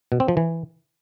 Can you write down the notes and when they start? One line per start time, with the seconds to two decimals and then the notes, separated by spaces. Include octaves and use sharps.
0.12 B2
0.20 C4
0.28 F3
0.37 E3